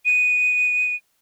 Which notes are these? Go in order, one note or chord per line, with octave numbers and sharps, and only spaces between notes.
D#7